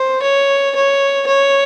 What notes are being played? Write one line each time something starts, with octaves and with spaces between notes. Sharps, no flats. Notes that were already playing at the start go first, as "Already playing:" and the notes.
Already playing: C5
C#5
C#5
C#5